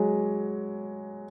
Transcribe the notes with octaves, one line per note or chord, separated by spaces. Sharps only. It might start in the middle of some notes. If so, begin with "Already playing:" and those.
Already playing: F#3 G#3